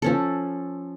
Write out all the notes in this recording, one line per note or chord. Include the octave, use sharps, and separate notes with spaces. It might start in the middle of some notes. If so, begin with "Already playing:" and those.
F3 C#4 A4